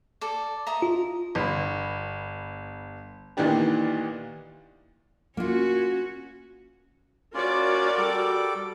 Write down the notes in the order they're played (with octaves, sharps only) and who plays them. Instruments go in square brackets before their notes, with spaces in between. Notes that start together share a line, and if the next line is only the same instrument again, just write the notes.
[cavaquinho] A4 D5
D#5 E5 A#5
[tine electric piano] F4
[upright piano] G1 B5
A#2 D#3 E3 B3 D4 G4
[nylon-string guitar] A#3 F4 [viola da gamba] C#4 F#4
[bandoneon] C#4 F4 [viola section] F#4 A#4 D5
[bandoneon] G3 A4 D6